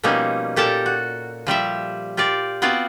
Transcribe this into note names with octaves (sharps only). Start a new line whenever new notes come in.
B2 F3 G3 A#3 C#4 D#4
A#2 G4 A4 A#4 A5 A#5
F#4
F3 G3 G4 E5
F4 G4 A#4 D5
B3 C4 F4 F#4 D5 F5